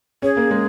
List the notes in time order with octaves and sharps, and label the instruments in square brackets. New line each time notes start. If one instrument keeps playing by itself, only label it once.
[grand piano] C#4 [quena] G#4
[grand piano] A#3
G#3